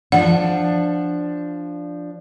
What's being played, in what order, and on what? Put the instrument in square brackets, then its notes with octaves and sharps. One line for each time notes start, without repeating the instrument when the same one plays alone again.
[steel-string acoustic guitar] F3 D4 [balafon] F#5